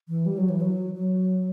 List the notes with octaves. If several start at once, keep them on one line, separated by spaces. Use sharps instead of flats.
E3
G3
F#3
E3
F#3
F#3